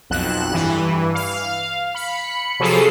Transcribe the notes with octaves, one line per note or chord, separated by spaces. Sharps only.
B1 F2 F#6 E7
G2 E3
F5
B5 C#7
C3 F3 F#3 G#4 A4 C7